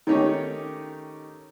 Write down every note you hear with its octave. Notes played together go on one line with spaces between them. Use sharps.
D#3 A3 C#4 D#4 G4 C#5